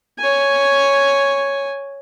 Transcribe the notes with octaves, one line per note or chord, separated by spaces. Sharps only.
C#5 G#5